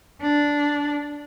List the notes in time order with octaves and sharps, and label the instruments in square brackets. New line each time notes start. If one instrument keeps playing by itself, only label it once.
[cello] D4